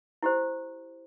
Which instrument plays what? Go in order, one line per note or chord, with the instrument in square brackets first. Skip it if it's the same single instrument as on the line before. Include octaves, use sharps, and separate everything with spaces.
[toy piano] E4 G4 C5